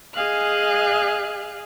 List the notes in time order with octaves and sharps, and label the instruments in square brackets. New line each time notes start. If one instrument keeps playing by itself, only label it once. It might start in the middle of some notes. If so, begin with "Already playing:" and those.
[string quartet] G#4 D#5 F5 G#5 F#6